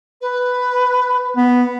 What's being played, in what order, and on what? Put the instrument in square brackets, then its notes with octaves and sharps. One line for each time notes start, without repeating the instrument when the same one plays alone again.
[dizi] B4
[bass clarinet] B3